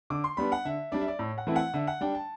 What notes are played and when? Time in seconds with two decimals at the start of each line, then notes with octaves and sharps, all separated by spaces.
0.10 D3 D6
0.24 C6
0.37 G3 B3 D4 B5
0.52 F#5
0.65 D3 E5
0.92 G3 D4 D5
1.01 E5
1.08 D5
1.19 A2
1.38 F#5
1.47 E3 A3 C4 E4
1.56 F#5
1.74 D3 E5
1.87 F#5
2.01 G3 D4 G5
2.15 A5